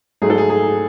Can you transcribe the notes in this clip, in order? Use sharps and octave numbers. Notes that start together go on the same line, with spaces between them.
G#2 F#3 A3 G#4
A4
G#4
G#4